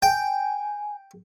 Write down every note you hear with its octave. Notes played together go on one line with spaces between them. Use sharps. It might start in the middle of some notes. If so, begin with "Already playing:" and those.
G5 G#5